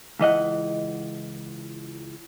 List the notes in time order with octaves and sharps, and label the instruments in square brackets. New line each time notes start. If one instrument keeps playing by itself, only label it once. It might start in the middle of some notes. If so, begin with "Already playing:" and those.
[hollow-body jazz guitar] C#2 E3 D#5 F#5